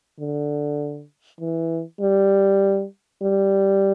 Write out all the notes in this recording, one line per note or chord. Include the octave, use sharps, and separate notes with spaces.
D3
E3
G3
G3